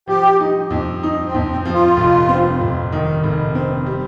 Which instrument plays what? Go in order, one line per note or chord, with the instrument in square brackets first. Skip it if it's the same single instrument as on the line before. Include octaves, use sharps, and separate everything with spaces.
[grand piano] F3 [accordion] G4
[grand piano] D#4
F2
D#4
[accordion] C4
[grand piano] F2
[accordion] C4
[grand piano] F3
[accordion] F4
[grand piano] F1
C4
F1
D#3
F1
C4
G3